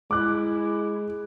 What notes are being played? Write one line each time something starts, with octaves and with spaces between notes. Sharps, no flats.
G#3 E4 D6 F#6